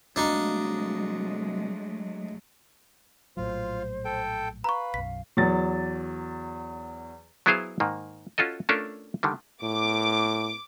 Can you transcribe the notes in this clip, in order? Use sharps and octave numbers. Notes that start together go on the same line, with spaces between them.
C2 F#3 G#3 A3 D4 D#4 F#4 F5
A#1 A2 F#3 F4 C5
A4 G5
B4 F5 A#5 C#6
B1 F#2 B6
E2 F#3 A6
F#3 B3 E4 G#4 C5 F5
G#2 D#3 A#3
C#4 F4 F#4 A4 D#5
A3 C#4 D4 F4 A4 A#4
D3 D#3 G3
A2 D6